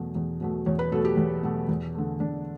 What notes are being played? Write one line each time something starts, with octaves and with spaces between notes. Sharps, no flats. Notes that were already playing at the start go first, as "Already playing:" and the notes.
Already playing: E2 B2 F#3 A3
E2
B2 F#3 A3
E2 C#5
B4
B2 F#3 A3 A4
G4
E2
B2 F#3 A3
E2
D3 A3
E2 D4